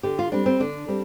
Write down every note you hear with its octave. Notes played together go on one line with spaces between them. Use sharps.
D3 G4
F4
G3 C4 D4
C4
D3 D4
G3 C4